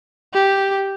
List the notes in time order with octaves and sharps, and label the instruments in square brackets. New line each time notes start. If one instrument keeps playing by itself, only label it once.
[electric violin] G4